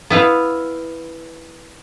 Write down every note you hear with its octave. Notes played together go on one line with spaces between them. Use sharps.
B3 E4 B4 F5